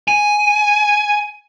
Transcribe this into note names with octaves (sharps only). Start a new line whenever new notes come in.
G#5